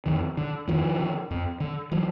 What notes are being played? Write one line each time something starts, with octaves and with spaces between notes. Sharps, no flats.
F2 D#3
D3
F2 D#3 F3
D3
F2
D3
E3 F#3